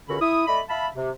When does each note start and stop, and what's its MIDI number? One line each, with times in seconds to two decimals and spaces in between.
0.08 0.16 37
0.08 0.16 50
0.08 0.16 61
0.08 0.16 66
0.08 0.16 70
0.08 0.16 83
0.21 0.45 64
0.21 0.45 87
0.47 0.60 57
0.47 0.60 74
0.47 0.60 75
0.47 0.60 83
0.69 0.88 76
0.69 0.88 77
0.69 0.88 81
0.69 0.88 83
0.95 1.10 48